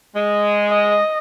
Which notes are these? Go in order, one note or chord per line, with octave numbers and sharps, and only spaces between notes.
G#3
D#5